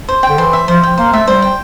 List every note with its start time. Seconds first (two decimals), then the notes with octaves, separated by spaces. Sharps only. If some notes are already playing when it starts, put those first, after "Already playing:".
0.09 C5
0.23 G5
0.29 D3
0.38 E3 C5
0.53 E5
0.68 F3 C5
0.83 F3 G5
0.98 A#3 C5
1.13 A3 E5
1.27 G3 C5
1.42 G5